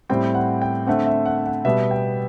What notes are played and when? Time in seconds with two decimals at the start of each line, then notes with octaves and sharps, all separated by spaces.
0.09 A2 G3 C4 G5
0.35 F#5
0.62 G5
0.87 D3 A3 C4 F#5
1.06 E5
1.26 F#5
1.46 F#5
1.65 B2 G3 B3 E5
1.91 G5